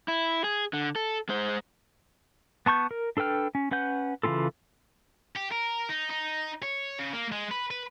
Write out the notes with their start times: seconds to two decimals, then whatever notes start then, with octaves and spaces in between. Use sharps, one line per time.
0.08 E4
0.44 G#4
0.73 D3
0.96 A4
1.29 G#3 C5
2.66 B3 A5 C#6 G6
2.91 A#4
3.17 D4 A4 B4 G5 F6
3.55 C#4
3.71 C#4 B4 F#5 G6
4.23 C#3 E3 C#4 F4 A4
5.36 G4
5.51 A#4
5.89 D#4
6.10 D#4
6.62 C#5
6.99 C#3
7.13 A#3
7.32 G#3
7.51 B4
7.71 B4